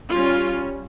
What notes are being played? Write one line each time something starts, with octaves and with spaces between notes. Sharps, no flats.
G3 C#4 F4